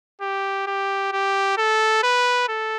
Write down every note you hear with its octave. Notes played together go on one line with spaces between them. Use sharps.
G4
G4
G4
A4
B4
A4